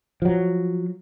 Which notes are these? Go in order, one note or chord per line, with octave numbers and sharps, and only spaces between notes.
F3 F#3